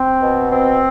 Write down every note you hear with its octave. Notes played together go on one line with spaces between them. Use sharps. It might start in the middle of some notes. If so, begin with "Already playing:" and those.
Already playing: C4
B2
C4